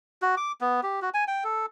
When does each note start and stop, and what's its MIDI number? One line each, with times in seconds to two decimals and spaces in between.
0.22 0.35 66
0.37 0.52 86
0.61 0.81 59
0.83 1.00 67
1.02 1.10 66
1.14 1.24 80
1.28 1.44 79
1.44 1.66 69